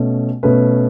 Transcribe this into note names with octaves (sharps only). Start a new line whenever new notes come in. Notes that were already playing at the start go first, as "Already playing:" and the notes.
Already playing: B2 A3 C#4
B2 A3 C#4 B4